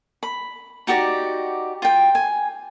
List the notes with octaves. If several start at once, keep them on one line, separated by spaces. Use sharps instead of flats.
B5
D#4 F#4 G4 D5
F4 G5
G#5